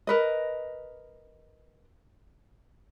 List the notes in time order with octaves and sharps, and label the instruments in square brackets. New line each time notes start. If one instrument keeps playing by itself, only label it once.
[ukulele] A#4 B4 D#5